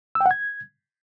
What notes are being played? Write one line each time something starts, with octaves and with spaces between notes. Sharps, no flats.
E6
G5
F#5
G#6